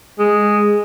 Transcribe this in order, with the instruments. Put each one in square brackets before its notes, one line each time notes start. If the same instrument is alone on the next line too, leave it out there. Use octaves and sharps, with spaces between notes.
[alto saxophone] G#3